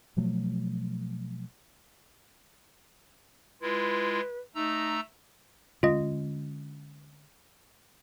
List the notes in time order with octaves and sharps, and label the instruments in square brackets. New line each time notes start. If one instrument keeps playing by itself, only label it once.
[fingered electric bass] B2 F3 F#3 A3
[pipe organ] G#3 E4 F4 [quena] B4
[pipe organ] A3 A#5 E6 [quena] D#4
[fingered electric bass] D3 G#3 C#4 [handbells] F4 D#5